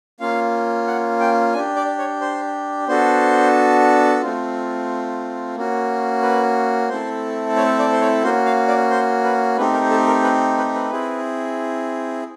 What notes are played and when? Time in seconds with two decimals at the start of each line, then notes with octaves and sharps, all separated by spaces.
0.20 A#3 C#4 F4 F5
0.87 F#5
1.20 G5
1.54 D4 G4 G#5
1.76 D5
1.98 C#5
2.21 C5
2.88 B3 D4 F#4 A4 C5
4.22 A3 C4 F4
5.55 A#3 C#4 F#4
6.22 B4
6.89 A3 C4 E4 A4 C5
7.56 C#5
7.79 D5
7.92 C5
8.01 C#5
8.23 A#3 C#4 F#4 C5
8.46 F5
8.68 D5
8.90 C5
9.24 B4
9.57 A3 C4 D#4 G4 B4
9.74 A#4
9.90 A4
10.07 A#4
10.24 B4
10.58 B4
10.74 B4
10.91 C4 E4 G#4